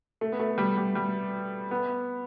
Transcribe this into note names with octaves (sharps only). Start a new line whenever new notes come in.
A3
B3
A3
G3
G3
G3
B3